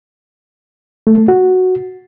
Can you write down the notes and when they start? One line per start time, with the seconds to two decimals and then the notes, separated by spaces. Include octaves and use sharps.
1.07 A3
1.18 A3
1.28 F#4